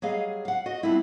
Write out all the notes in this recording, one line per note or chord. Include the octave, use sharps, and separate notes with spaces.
F#3 G3 G#4 D#5 F5
F5 F#5
F#4 D#5
G3 B3 C4 D4 E4 F4